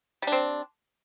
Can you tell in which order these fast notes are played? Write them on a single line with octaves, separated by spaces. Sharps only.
G3 D4 C4